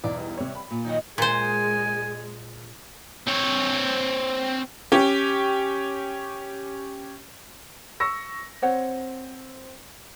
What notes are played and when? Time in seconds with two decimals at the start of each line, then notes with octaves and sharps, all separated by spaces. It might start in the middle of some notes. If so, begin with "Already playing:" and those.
0.04 B1 E2 D5
0.19 G3
0.38 C3 C#5
0.55 B5
0.71 A#2
0.84 D#3 F#3 D#4
1.18 A#2 G#3 C5 G#5
3.28 C4 C#5
4.92 C#4 G4
8.00 C#6 E6 A#6
8.62 C4 C5 C#5 F#5